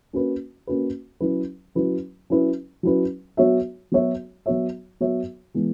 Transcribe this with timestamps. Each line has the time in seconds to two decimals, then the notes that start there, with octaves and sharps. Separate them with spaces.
0.13 A#3 C#4 F#4 B4
0.67 A#3 C#4 F#4 B4
1.20 F#3 C#4 E4 B4
1.75 F#3 C#4 E4 B4
2.30 F#3 C#4 E4 B4
2.83 F#3 C#4 E4 B4
3.37 F#3 B3 F#4 C#5 E5
3.92 F#3 B3 F#4 C#5 E5
4.46 F#3 B3 F#4 C#5 E5
5.00 F#3 B3 F#4 C#5 E5
5.55 E3 G#3 B3